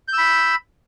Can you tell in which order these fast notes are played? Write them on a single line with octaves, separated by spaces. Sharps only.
G6 E6 B5